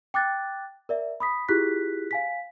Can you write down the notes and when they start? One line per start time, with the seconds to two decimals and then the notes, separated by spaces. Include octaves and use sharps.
0.14 G5 D6 F#6 A6
0.89 A#4 D5 E5
1.20 B5 D#6 B6
1.49 E4 F4 G4 G#4 F#6 B6
2.11 F5 G#5 B6